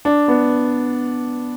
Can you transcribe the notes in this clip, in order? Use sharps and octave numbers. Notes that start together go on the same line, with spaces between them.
D4
B3